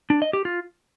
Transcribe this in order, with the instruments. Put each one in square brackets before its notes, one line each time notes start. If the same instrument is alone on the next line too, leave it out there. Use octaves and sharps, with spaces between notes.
[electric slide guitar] D4
D#5
G4
F4